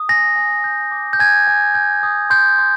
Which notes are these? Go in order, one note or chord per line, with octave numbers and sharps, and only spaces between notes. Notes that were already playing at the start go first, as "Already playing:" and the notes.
Already playing: D#6
G#5 A#6
G#5
G6
D6
G6
G#5 G#6
G#5
G6
D#6
C6 G6
C6